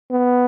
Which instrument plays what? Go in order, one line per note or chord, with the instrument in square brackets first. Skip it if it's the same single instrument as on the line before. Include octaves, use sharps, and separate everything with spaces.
[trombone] B3